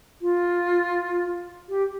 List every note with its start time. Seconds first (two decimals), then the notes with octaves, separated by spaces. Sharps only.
0.22 F4
1.69 G4